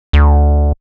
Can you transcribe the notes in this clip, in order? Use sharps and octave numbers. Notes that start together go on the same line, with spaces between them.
D2